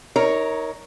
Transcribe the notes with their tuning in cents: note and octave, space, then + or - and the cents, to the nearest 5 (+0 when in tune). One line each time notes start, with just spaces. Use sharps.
D#4 +30 A#4 +0 C#5 +0